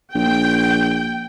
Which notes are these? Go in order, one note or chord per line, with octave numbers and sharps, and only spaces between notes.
A#1 G5